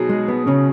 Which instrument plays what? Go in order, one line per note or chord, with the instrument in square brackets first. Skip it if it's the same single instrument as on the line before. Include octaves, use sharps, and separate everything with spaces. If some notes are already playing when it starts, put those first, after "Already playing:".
Already playing: [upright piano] B2 F#3 D#4 G#4
[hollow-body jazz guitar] G#3
B3
C#3 C#4